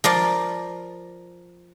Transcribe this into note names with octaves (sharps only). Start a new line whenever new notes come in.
F3 A#4 D5 F5